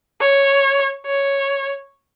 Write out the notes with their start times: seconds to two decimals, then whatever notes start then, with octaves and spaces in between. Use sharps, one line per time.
0.21 C#5
1.06 C#5